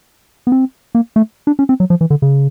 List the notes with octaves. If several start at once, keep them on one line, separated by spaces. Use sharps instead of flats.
B3
C4
A#3
A3
D4
C#4
C4
F#3
F3
E3
D3
C#3